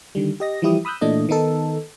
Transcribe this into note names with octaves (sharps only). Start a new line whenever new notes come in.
D3 D#3 G3
G4 D#5 A#6
E3 F3 G3 E4 G4 D#6
B5 D#6 E6 F#6 G6
A#2 E3 A3 D4 D#5
D#3 B3 D#4 A4